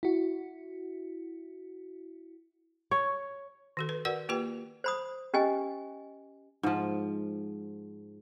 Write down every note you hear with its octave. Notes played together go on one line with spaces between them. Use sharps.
E4 F#4
C#5
D#3 F#4 A4
A4 B4
F#4 A#4 B4 D5 F#5
A#3 F4 G4 B4 G5
C5 B5 D#6
C#4 G4 D#5 G#5
G#2 F3